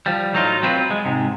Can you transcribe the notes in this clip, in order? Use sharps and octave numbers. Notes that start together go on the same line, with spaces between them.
F3 G3
A2 F#3 D#4 F4
F#3 C4 E4 F4 B4
G#3
G#2 C3